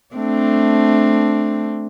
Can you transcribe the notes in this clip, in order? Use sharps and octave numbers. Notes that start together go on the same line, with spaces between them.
A3 C4 D4